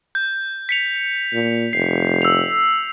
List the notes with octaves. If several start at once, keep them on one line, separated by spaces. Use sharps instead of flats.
G6
B6 C#7 F7
A#2
F1 C7
E6 F7